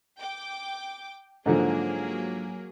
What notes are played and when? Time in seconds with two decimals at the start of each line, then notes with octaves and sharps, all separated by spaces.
0.18 G5 D6
1.46 G#2 D3 F3 F#3 A#3 G#4